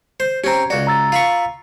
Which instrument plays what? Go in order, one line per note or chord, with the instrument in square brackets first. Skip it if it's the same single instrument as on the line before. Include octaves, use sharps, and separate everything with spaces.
[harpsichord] C5
[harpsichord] C4 C#4 [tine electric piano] G4 A#5
[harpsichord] C#2 F#4 [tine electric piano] D5
[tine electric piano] A#5 E6 A6
[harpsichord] F4 B5 C#6